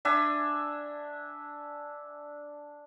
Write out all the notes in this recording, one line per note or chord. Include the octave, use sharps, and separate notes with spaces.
D4 E5 G#5